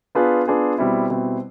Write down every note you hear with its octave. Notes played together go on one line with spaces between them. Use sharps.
B3 D4 F4 G#4 B4
B3 D4 F4 G#4 B4
B2 G3 C4 E4
B2 G3 C4 E4